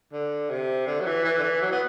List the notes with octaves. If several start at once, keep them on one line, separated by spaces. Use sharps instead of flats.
D3
C3
D3
F#3
E3
E3
D3
E3
F#3
B3